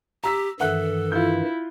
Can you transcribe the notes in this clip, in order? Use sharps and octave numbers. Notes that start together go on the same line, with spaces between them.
G4 A#5 E6 B6
G2 D#3 E3 A4 E5 F#5 F#6
E4 F4 G6